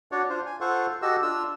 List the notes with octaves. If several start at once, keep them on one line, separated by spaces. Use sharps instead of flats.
D4 F#4 C#5 D5
D4 F4 C5
G#5
F4 A4 C5 F#5 C#6
F#4 G4 A4 D#5 E6
D4 F4 E6